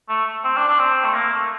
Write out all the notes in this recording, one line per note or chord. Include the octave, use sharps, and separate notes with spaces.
A3
C4
D4
D4
C4
A3
A#3
A3